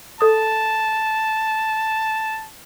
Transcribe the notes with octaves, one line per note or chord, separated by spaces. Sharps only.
A4 A5 D#6